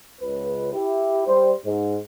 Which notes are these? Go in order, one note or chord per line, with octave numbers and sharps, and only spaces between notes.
C#2 B4
E4 G4
G3 C5
G#2